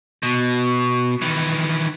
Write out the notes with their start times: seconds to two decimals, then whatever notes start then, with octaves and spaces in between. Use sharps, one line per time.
0.23 B2
1.22 D#3 E3